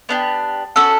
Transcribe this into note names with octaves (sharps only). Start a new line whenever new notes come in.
B3 D4 G4
C#4 F#4 A4 E6